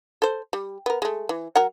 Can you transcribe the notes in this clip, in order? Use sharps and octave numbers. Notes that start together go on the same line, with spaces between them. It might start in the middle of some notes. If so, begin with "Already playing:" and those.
A4 C5
G3
B3 A#4
G#3 A3
E3
F#3 A#4 F#5